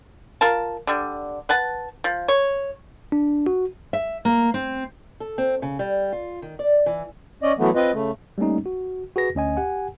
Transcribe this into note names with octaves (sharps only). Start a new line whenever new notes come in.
F4 A#4 A5
D3 G3
B4 F#5 A5
F3
C#5
D4
F#4
E5
A#3
C4
A4
C4
C#3
G3
F4
D#3
D5
E3
C#4 D5 D#5
E3 F#3 A3 B3
C4 F4 B4 D#5
C#3 A3
G3 A3 A#3 C#4 D#4
F#4
F#4 G#4 B4 A#6
D2 C#4 D#5 G#5
G4 F#5 G#5